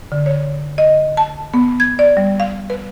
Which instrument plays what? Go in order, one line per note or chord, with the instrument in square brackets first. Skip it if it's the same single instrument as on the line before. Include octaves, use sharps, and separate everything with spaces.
[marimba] D3
C#5
D#5
A5
B3
G#6
D5
G3
F5
B4